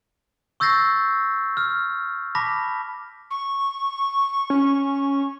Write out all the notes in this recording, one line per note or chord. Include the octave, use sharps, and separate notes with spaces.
C#6 E6 G6 A6 A#6 C7
F6
A5 B5 D6 A#6 B6
C#6
C#4